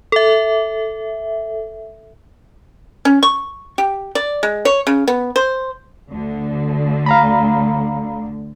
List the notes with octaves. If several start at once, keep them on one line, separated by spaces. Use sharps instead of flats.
A4 E5
C#4
C#6
G4
D5
G#3
C#5
C#3
B3
C5
D2 D3
F5 A#5 B5